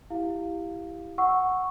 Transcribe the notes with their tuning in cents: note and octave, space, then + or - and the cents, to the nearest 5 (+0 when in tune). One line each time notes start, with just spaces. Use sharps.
E4 +0 G4 +0 F5 +0
F#5 +0 C#6 +0 E6 +0